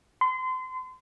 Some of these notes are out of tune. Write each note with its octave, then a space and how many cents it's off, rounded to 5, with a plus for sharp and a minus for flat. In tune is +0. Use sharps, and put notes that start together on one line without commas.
C6 -30